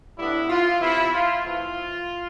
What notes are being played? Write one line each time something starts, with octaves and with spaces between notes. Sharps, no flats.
A2 G3 B3 D4 E4
F4
C3 E3 B3 E4
F4
E3 A3 C4 F4